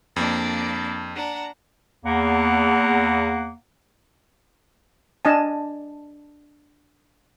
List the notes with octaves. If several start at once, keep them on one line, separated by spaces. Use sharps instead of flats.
F2 A#3 D4 D5
D4 F#5 A#5
E2 A#3 F#5
D4 D#5 G#5 A5